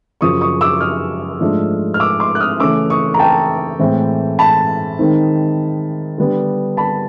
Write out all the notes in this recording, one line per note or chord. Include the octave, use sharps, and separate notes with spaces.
F#2 C#3 F3 C#6 D#6
C#6 D#6
D6 E6
D#6 F6
G#2 F3 A3 D4
F6
D6 E6
C6 D6
F#6
D#6 F6
C#3 E3 A3 C#4 D6 E6
C#6 D#6
A#5
G5 A5
A2 E3 G#3 C4
A5 B5
D#3 G#3 C4 D#4
D3 G3 B3
A5 B5